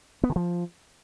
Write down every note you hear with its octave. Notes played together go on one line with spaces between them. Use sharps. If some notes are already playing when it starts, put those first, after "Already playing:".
B3
D3
F3